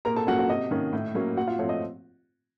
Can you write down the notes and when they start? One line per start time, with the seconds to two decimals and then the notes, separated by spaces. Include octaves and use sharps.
0.05 A#2 A#4 A#5
0.16 A4 A5
0.27 F#3 A#3 C#4 F#4 F#5
0.39 F#4 F#5
0.49 C3 D#5
0.71 D#3 A#3 C#4
0.93 A2
1.14 F#3 A#3 C#4
1.37 A#2 F#4 F#5
1.47 F4 F5
1.59 F3 A3 C4 C#5
1.69 D#5